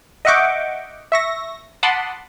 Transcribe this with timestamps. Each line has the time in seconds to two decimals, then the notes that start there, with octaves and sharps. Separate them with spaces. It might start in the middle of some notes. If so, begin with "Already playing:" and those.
0.25 D#5 E5 F#5 C#6 D6 G6
1.12 E5 C#6 A#6
1.83 F#5 A5 B5 C6 D6 D#6